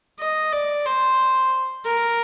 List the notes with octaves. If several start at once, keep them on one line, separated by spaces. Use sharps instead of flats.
D#5
D5
C5
A#4